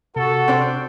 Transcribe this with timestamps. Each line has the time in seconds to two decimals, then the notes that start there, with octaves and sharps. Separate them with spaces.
0.16 C3 F#4 A4
0.48 C4 D4 C5